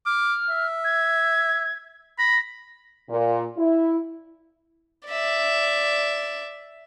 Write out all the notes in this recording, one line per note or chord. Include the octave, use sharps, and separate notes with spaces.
D6 F6
E5
G#6
B5 A#6
A#2
E4
D5 E5